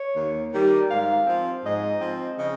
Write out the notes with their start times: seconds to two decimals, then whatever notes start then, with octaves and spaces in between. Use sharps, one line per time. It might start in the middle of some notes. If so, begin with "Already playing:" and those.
Already playing: C#5
0.15 D#2
0.52 D#3 G3
0.89 G#2 F5
1.27 F3 C4
1.64 G#2 D#5
2.01 F3 C4
2.38 C#3 D#5